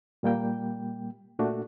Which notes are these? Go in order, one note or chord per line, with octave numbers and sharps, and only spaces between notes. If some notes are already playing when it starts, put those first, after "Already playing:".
A#2 G3 A#3 G5
A#2 A3 D4 F#4